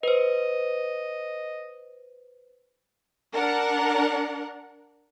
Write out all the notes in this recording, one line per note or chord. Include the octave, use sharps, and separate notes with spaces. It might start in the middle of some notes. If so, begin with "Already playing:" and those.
B4 C5 D#5
D4 A#4 F#5